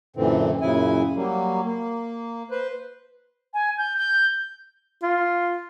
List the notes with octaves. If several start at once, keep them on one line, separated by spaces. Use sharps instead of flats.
F#2 A#2 D3 E3 C4
F#2 A#2 C#3 E4 G#5
F#3 G3 A#3
A#3
B4 C5
G#5
G6
G6
F4